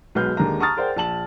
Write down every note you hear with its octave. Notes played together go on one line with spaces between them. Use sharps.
B1 B2 G#3 B4 F6 G6
D#2 G#3 D4 A4 A#4 A#5
A5 A#5 C#6 D#6 F6 A6
G#4 A#4 C5 D5 F#5 G5
A#1 A5 F#7